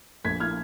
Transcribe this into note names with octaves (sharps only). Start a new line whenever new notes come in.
A#1 G#6 B6
A#2 F6 G#6